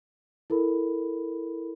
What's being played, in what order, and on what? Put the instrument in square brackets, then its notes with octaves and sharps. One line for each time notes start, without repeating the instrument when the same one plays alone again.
[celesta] E4 A4 A#4 B5